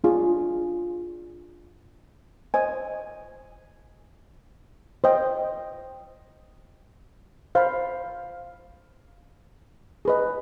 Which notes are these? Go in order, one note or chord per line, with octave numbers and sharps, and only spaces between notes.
D4 F4 G#4
C5 D#5 G#5
C5 D#5 G5
C5 F5 B5
G#4 B4 D#5